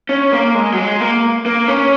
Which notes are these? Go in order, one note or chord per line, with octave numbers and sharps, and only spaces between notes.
C#4
A#3
G#3
F#3
G#3
A#3
A#3
C#4